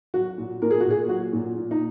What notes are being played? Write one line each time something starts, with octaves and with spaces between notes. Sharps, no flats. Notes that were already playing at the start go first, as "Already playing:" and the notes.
F#3 F#4
A#2
A#2 A#4
G#4
F#4
A#2 G#4
F#3 F#4
A#2
A#2
D#4